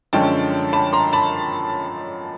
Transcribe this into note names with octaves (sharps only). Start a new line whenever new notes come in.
F#2 D3 F3 G#3 C#4 G5 A5
A5 B5
A#5 C6
A5 B5